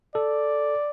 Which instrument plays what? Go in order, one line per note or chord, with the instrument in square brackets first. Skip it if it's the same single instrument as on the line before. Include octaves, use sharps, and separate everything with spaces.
[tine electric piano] A4 [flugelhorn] D5